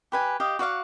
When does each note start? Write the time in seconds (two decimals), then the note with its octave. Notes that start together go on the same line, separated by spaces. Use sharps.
0.12 G4 B4 G#5
0.40 G4 D#5 F5
0.59 F#4 D5 F5 F#5